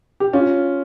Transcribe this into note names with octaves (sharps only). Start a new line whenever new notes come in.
G4
C#4 F4